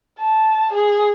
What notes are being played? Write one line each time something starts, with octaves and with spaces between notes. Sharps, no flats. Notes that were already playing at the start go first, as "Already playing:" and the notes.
A5
G#4